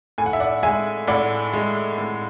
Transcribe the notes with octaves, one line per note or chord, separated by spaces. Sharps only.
A2 G#5
F#5
E5
D5 F#5
G#3 E5 G#5
A2 D5 F#5
G#3
A2